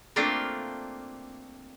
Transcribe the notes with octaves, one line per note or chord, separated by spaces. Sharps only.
A3 A#3 C4 D4 F4